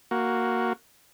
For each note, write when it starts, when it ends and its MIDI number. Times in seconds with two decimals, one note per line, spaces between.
0.11 0.73 58
0.11 0.73 66